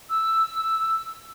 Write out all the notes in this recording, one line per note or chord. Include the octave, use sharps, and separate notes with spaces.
E6